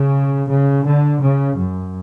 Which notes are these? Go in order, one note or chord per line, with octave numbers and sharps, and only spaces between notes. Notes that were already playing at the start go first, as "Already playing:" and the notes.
Already playing: C#3
C#3
D3
C#3
F#2